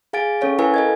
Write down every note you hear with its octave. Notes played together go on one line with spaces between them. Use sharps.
G#4 F5 G#5 A6 D7
C#4 A4 C#5 F5
E4 A#4 B4 F5 G#5
A4 D#5 G#6